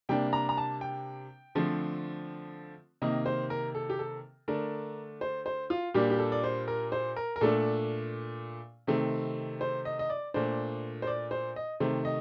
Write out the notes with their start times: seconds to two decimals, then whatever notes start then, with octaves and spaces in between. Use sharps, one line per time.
0.09 C3 G3 A#3 D4 G5
0.33 A#5
0.49 A#5
0.57 A5
0.81 G5
1.55 D3 F3 A3 C4
3.02 C3 D#3 A#3 D#5
3.26 C5
3.50 A#4
3.75 A4
3.90 G4
3.99 A4
4.48 D3 A3 D4 A#4
5.21 C5
5.46 C5
5.70 F4
5.94 A#2 G3 A#3 D4 G4
6.10 G4
6.19 A4
6.32 D5
6.44 C5
6.68 A#4
6.92 C5
7.16 A#4
7.36 A#4
7.41 A#2 A3 D4 A4
8.87 C3 D#3 A3 C4
9.61 C5
9.85 D#5
9.99 D#5
10.10 D5
10.34 A#2 A3 D4 C5
11.02 C5
11.07 D5
11.31 C5
11.56 D#5
11.80 C3 D#3 A3 C5
12.05 D#5